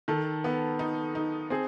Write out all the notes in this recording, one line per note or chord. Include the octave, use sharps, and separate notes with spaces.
D#3 A4
B3
D#4
D#4
C4 G#4